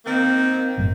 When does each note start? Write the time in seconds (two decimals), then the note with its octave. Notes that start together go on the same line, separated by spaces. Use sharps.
0.06 D#3 A#3 C4
0.78 G1 F#2 A2